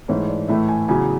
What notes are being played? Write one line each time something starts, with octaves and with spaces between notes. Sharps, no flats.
G#2 E3 A3 C#5
D5
A2 E3 A3 E5
G#5
E2 C#3 F#3 G#5